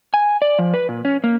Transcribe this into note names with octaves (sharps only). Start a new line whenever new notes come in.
G#5
D5
F3
B4
A#2
C#4
A#3